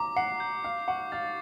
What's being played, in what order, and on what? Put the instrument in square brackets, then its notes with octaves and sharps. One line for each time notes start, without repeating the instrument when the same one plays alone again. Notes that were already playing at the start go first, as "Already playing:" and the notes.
Already playing: [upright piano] A#5 [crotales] D6
[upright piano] F#5 [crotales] C7
[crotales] G6
[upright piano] F5 [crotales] C7
[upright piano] F#5 [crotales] C#6
[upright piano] F5 [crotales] A6